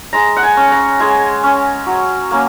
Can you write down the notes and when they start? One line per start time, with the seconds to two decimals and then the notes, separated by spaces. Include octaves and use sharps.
0.13 G#3 A#5
0.37 F#5
0.43 G#5
0.57 C#4
0.72 A#5
1.00 G#3 G#5
1.44 C#4
1.86 F#3
2.31 A#3 C#4